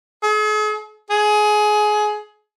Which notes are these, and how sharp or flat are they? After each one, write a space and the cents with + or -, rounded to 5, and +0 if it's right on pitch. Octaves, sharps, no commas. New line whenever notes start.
G#4 +45
G#4 +20